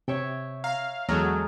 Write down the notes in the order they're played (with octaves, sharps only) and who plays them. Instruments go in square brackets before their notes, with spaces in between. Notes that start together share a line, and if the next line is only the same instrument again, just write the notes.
[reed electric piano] C3 [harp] C#5 E5 G5
[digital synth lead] F5 [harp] A#5
[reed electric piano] E2 A#5 F6 [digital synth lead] F#3 [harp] G#3 G#4 A4